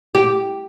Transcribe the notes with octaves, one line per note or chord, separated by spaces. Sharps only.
G4